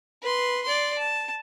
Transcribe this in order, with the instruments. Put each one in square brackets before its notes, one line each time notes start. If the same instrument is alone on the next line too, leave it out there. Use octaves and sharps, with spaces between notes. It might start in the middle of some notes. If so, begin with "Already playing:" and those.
[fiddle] B4 C6
D5 C6
A5